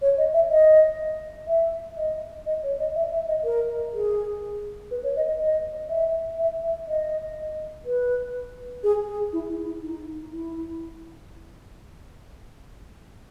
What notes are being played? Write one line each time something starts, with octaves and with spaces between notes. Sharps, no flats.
C#5
D#5
E5
D#5
E5
D#5
D#5
C#5
D#5
E5
E5
D#5
A#4
G#4
B4
C#5
D#5
D#5
D#5
E5
E5
E5
D#5
B4
G#4
G#4
E4
E4
E4
D#4
E4